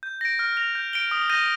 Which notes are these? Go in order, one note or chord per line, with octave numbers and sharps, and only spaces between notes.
G6
A#6 D7
F6
A#6 F7
G6
D7 G7
D#6
G6 A#6 D#7